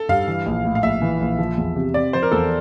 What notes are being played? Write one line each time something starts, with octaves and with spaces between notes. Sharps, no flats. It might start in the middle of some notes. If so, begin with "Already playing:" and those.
Already playing: A4
G2 F5
E3
A#1
A2
F5
A#1 E5
E3
A#1
F3
E2
C3
C4 D5
F3 C5
A#4
E2 A4